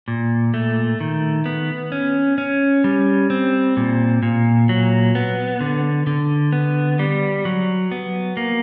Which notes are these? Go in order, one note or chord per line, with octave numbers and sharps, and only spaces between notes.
A#2
A3
D#3
B3
C#4
C#4
G3
C4
A#2
A#2
F#3
B3
D3
D3
B3
G3
F#3
B3
A#3